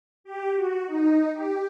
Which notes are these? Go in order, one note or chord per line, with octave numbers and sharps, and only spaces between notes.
G4
F#4
D#4
G4